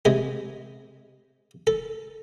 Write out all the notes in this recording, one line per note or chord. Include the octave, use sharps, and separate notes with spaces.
C3 G#3 G#4
A4